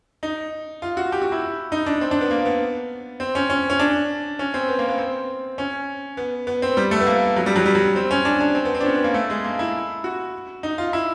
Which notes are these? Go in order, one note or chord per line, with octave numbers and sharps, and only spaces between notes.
D#4
F4
F#4
G4
F#4
E4
D#4
D4
C4
D4
B3
A#3
B3
C4
C#4
C#4
C#4
D4
C#4
C4
B3
A#3
B3
C4
C#4
B3
B3
C4
G3
A3
B3
A#3
F#3
G3
F#3
G3
F#3
C4
C#4
D4
D4
C4
B3
C4
D4
C#4
B3
A#3
A3
G#3
A#3
E4
F#4
D#4
F4
E4